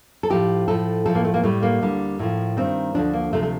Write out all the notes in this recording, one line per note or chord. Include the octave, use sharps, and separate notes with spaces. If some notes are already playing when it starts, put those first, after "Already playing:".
A4
A2 F3 G4
A2 F3 A4
A2 F3 A4
A#3
A3
A#3
A2 G3 A3
A#3
D2 D3 G3
A2 F3
G2 D#3 G3 C4
D2 D3 F3 D4
A#3
D2 C3 F3 A3
A3